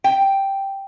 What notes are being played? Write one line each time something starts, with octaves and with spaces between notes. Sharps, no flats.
G5